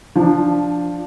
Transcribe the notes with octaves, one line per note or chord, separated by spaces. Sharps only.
F3 D4